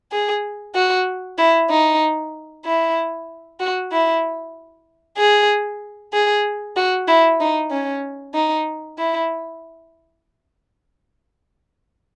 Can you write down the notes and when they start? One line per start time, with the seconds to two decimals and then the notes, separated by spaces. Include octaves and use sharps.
0.12 G#4
0.75 F#4
1.38 E4
1.70 D#4
2.65 E4
3.60 F#4
3.92 E4
5.18 G#4
6.13 G#4
6.76 F#4
7.07 E4
7.40 D#4
7.71 C#4
8.34 D#4
8.98 E4